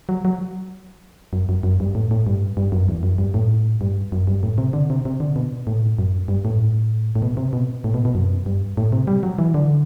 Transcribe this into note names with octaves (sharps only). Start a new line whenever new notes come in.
F#3
F#3
F#2
F#2
F#2
G2
A2
A2
G2
G2
F#2
E2
F#2
G2
A2
G2
F#2
G2
A2
C3
D3
C3
C3
D3
B2
A2
F#2
G2
A2
A2
B2
C3
B2
A2
B2
B2
F#2
G2
A2
C3
G3
F#3
E3
D3